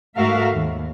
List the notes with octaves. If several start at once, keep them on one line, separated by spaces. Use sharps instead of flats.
G#2 A3 F#4 A#4 E5 F5
D#2